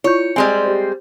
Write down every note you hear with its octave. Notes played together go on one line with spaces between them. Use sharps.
E4 F4 C#5 G6
G3 G#3 C4 G#5
G4 C5